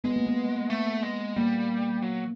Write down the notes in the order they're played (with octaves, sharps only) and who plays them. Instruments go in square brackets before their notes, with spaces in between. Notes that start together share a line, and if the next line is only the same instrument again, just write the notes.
[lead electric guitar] G#3 [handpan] B3
[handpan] A#3
B3
[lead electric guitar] A3
G#3
[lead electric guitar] G3 [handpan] A#3
[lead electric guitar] F#3